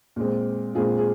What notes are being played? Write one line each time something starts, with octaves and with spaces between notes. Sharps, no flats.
A#2 G#3 C4
A#2 G#3 C4 F4 G#4
G#4